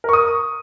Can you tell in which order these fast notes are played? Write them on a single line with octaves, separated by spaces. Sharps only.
A#4 C#6 D#6